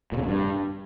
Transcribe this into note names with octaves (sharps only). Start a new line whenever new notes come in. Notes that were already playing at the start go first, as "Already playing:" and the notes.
A#2
C#3
B2
G2